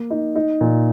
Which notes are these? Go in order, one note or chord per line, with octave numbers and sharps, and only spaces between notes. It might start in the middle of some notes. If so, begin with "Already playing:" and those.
Already playing: A#3
D#4
D#4
A#2